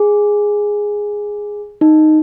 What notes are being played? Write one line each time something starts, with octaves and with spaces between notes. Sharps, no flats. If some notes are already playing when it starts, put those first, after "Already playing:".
Already playing: G#4
D#4